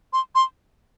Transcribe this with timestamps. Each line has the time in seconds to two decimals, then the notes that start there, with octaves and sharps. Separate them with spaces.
0.13 C6
0.35 C6